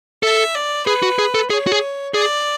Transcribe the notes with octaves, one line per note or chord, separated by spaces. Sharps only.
A4 E5
D5
G#4 B4
F#4
G#4
A4
G#4 C#5
F#4
G#4
G#4 D5